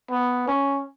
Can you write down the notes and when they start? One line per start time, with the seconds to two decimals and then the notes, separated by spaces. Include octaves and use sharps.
0.11 B3
0.48 C#4